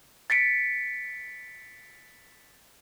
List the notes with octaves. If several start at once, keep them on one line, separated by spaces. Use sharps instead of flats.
A6 B6 C#7 D7